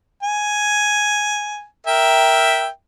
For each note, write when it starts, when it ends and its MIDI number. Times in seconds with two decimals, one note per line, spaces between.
0.23 1.65 80
1.87 2.68 70
1.87 2.68 76
1.87 2.68 79